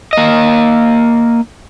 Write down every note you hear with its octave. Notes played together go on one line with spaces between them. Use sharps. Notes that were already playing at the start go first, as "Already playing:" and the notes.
A#3 D#5